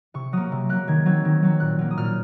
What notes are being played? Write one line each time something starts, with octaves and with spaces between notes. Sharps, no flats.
C3 C#6
F#3 A#3 D#6
C3
F#3 A#3 F#6
D#3 G#6
F#3 C4 G#6
D#3
F#3 C4
A#2 F#6
F#3 A#3
D#6
A#2 F6